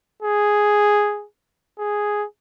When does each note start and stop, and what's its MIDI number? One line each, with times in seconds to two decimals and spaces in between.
0.22 1.26 68
1.79 2.25 68